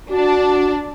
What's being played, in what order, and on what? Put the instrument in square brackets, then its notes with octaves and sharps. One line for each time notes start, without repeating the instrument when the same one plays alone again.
[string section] D4 [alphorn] F#4